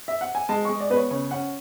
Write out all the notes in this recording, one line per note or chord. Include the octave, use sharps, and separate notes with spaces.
E5
F#5
G#5
G#3 A5
G#3 C#6
D5
B3 B4
C#5
C#3 C#5
C#4 F#5